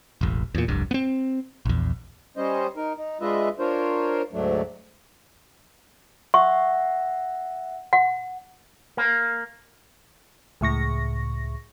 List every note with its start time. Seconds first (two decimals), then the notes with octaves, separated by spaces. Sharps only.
0.21 E1 A1
0.55 E2 A#2
0.68 F1 C2 G2
0.91 B3 C4
1.65 A#1 E2
2.37 G3 C#4 C5 D#5
2.77 D#4 A#4
2.97 D#4
3.21 G#3 D4 F4 B4 D#5 E5
3.59 D4 F4 A#4 C5 C#5
4.33 D2 G#2 F#3 A3 D4
6.34 E5 F#5 C#6
7.93 F#5
8.97 A#3
10.61 C#2 A2 C#6 A#6